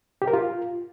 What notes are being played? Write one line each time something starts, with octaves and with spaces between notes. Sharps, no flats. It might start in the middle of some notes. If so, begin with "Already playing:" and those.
G4
A#4
F4